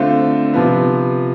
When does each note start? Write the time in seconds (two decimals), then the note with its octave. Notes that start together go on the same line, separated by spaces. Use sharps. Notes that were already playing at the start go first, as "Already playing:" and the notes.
Already playing: D3 A3 C4 F4
0.54 C3 F3 B3